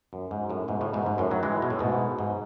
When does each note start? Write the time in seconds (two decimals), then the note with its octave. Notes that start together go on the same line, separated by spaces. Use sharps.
0.13 F#2
0.31 G#2
0.49 F#2 A2
0.68 G#2 B2
0.81 A2 C#3
0.93 G#2 B2
1.06 G#2
1.18 F#2 A2
1.31 D#3 F#3
1.43 E3 G#3
1.62 B2
1.70 A2
1.79 G#2 B2
2.19 G#2